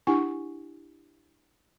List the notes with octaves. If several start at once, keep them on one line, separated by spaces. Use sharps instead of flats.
D4 E4 G4 F#5 G#5 C#6